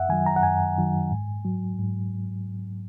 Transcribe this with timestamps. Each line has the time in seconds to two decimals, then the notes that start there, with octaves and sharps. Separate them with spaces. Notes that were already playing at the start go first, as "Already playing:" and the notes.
Already playing: F#2 E5 F#5
0.09 D#3 F#3 G#5
0.26 A#5
0.36 F#5
0.43 F#2 G#5
0.78 D#3 F#3
1.12 G#2
1.45 F#3
1.79 G#2